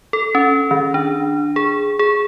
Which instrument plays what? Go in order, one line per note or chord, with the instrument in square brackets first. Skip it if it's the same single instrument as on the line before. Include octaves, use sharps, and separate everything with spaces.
[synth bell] A4
C#4
D#3
D4
G#4
G#4